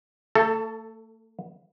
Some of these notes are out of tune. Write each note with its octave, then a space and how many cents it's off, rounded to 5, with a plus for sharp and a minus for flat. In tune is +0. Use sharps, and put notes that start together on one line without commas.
A3 +35 A4 +5